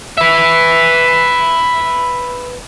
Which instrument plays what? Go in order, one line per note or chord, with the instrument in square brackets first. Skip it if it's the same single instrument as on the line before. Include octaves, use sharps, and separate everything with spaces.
[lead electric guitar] B4 E5